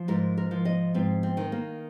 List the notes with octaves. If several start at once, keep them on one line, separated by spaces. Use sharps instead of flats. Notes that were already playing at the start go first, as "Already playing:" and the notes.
Already playing: F3
G#2 A#4
A#4
F3
D#5
G#2 C4
C4
D#3
A#3